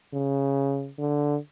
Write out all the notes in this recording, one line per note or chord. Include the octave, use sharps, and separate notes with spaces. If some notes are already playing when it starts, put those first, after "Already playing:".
C#3
D3